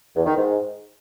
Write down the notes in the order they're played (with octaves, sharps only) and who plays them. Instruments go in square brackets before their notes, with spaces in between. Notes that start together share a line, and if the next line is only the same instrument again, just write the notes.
[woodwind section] E2
D#3
G#2